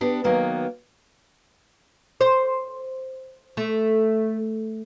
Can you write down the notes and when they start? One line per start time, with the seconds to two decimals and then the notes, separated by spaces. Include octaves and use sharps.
0.01 B3 D4 G4
0.24 D#3 F#3 A#3 B3
2.21 C5
3.57 A3